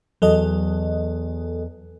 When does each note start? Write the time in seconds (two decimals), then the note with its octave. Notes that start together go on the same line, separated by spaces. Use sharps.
0.22 E2 F#3 A4 D#5